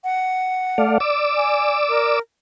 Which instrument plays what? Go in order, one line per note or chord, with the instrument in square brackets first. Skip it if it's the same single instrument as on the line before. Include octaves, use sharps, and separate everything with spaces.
[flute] F#5
[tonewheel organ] A3 D5 F5
D5 D6 E6
[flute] G#5
A#4